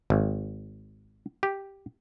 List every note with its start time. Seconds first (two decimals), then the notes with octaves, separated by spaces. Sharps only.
0.10 G#1
1.43 G4